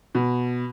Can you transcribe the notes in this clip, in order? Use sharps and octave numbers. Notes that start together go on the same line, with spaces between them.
B2